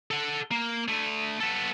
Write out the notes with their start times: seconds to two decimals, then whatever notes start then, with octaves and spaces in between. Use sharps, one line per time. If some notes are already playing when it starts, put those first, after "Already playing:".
0.11 A4 F#5
0.51 A#3
0.88 D3 A3
1.41 B3 A4